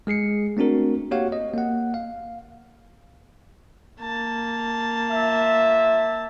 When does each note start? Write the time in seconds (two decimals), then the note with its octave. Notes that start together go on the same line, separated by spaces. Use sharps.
0.07 G#3 G#4 C7 C#7
0.57 A3 C4 D4 F#4 A#4
1.11 A#3 F#4 G4 C#5 F5 F#5
1.32 D#5
1.54 A#3 F#5
1.94 F5
4.01 A#3 A5
5.09 F4 E5